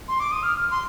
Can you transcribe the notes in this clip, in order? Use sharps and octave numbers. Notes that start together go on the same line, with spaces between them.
C6
D6
D#6
F6
C6